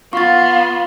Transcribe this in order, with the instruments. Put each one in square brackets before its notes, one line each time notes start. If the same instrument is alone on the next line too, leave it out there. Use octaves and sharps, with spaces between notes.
[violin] B3 [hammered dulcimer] F4 [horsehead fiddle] F5 [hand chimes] C#6 A6